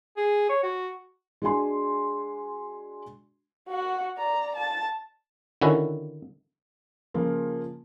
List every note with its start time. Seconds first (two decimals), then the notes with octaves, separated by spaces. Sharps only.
0.17 G#4
0.49 C#5
0.63 F#4
1.42 G#3 D4 F#4 G#5 C6
3.69 F#4 F#5
4.17 D5 A#5
4.56 A5
5.62 D3 D#3 C#4 E4 F#4
7.14 C#3 F3 A#3 F4